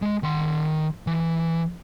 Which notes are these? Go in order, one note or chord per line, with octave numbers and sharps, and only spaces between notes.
G#3
D#3 C6
E3